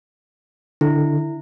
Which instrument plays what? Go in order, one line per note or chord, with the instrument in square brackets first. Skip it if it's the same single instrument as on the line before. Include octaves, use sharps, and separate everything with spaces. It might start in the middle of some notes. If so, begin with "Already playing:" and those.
[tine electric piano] D3 [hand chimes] E4